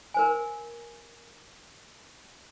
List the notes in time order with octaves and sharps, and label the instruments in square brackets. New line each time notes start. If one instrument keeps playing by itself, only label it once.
[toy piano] A#4 C5 G#5